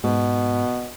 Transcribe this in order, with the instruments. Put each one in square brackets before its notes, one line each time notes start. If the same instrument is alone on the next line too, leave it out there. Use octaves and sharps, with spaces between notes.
[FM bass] G#2 [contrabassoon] B2